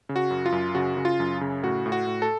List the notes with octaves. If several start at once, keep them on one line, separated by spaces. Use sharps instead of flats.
C#3
F#4
F#2
F4
F#2
C#3 F#4
C#3
F4
F#2
C#3
A2 F#4
A2
F#4
A2
A4